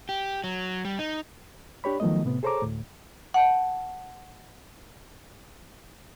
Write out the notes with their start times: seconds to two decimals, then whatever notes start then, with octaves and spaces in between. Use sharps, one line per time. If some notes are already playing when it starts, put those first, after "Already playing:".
0.09 G4
0.44 F#3
0.85 G3
0.99 D#4
1.84 D4 G4 C#5 B5
2.00 D#3 F3 F#3 A3 B3 D#5
2.25 A2 C3 B3
2.43 G#4 A4 C5 C#5 A#5 D6
2.62 D2 A2
3.34 F#5 A5 G6